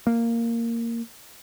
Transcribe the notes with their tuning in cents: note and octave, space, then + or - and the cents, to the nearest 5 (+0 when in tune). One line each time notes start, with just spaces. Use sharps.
A#3 -10